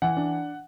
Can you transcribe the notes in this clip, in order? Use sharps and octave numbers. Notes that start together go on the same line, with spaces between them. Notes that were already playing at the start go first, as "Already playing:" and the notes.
E3 F#5
D4